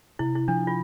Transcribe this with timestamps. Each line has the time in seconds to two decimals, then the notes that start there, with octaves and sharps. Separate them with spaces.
0.19 C3 E4
0.35 E4
0.48 F3 D4
0.67 F4